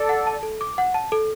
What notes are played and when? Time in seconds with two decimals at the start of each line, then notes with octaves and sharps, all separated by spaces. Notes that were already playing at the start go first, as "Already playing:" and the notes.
Already playing: A4 D5
0.09 F#5
0.27 A5
0.43 A4
0.61 D6
0.78 F#5
0.94 A5
1.12 A4